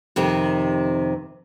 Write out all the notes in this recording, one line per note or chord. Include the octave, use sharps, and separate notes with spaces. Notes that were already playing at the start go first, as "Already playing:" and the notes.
F2 C3 D#3